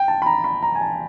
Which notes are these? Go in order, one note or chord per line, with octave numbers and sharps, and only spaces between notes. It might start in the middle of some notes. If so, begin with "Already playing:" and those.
Already playing: G5
A5
B5
A#5
B5
A#5
G#5
A5